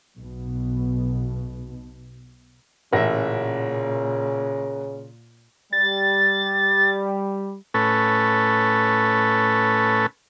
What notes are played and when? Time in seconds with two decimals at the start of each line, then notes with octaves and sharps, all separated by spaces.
0.16 B1 B2
2.93 A1 A#2 C#3 A#4 E5 F#5 A#6
5.73 G3 A6
7.74 A2 C#4 A4 B4